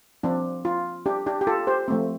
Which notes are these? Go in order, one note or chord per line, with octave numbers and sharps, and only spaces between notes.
F3 C4 D4
F4
D4 G4
D4 G4
G4
F4 A4
G4 C5
F3 A3 C4